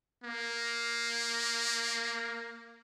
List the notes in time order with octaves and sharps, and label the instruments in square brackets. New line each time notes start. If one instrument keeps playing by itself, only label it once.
[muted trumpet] A#3